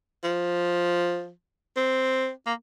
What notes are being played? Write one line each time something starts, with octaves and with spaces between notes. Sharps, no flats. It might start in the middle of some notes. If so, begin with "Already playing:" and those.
F3
C4
A#3